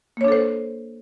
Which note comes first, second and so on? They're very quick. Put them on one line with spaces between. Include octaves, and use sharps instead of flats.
A#3 C#5 D4 A4 C5